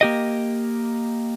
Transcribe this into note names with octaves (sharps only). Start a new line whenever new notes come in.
A#3 G4 D#5